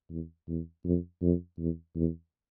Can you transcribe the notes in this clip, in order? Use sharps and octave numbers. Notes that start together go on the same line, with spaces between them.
E2
E2
F2
F2
E2
E2